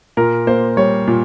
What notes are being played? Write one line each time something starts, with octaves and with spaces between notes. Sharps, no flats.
A#2 A#4
A#3 C5
G3 C#5
A#2